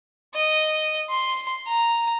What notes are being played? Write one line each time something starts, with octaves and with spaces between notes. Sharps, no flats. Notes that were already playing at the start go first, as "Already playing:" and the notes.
D#5
C6
A#5